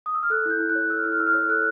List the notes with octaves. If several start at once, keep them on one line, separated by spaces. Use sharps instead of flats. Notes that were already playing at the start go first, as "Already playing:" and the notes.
D#6
E6
F6
A4 F#6
E4 G6
E4
F#6
C#5
A4 E6
F6
E4 E6
F6
E4 E6
F6
C#5 E6
A4 F#6